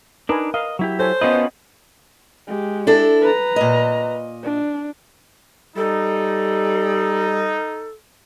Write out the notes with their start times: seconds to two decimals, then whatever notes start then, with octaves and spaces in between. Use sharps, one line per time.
0.29 D4 D#4 A#4 B4 G#5
0.54 A#4 D#5 F5
0.79 F#3 E4 G4
0.99 A4 C5 C#5 G#5
1.21 B3 C#4 F4 B4 D#5
2.48 G#3 G4
2.87 D4 E4 A4
3.22 B4 A#5
3.56 A#2 D#5
4.43 D4
5.76 G3 D#4 A4